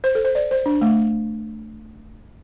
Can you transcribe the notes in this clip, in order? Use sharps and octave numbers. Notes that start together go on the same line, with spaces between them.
C5
A4
C5
D5
C5
D4
A3